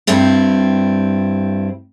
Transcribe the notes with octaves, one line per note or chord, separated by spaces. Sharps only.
G2 G3 C4 E4